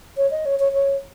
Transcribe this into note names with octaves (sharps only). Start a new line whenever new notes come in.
C#5
D#5
C#5
C#5
C#5